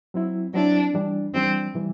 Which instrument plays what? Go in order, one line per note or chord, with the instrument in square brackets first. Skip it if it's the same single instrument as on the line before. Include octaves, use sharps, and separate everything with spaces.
[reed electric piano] F#3 C4 E4
[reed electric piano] F#3 C4 E4 [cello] D4
[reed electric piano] E3 G3 D4
[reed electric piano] E3 G3 D4 [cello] C4
[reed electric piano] C3 E3 G3